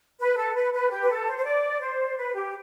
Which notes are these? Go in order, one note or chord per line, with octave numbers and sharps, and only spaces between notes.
B4
A4
B4
B4
G4
B4
A4
C5
C5
D5
C5
B4
G4